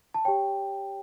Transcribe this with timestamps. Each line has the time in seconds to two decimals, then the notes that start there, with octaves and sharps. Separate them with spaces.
0.14 A5
0.25 G4 C#5 G5